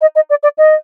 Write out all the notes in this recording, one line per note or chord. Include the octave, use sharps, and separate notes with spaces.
D#5
D#5
D5
D5
D#5